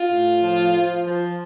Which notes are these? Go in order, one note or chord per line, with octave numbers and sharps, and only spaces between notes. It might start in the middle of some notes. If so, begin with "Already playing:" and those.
Already playing: F4
A2
F3
F3
F3